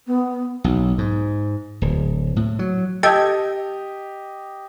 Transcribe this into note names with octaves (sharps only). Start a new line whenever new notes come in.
B3
B1
G#2
D1
A2
F#3
G4 A4 D#5 G5 G#6